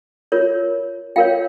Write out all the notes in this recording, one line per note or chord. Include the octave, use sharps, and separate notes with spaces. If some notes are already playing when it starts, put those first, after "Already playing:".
F4 A#4 C#5
F4 A#4 C#5 F5 G5